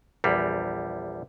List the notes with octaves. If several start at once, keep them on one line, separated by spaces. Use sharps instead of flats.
A#1 E2 G3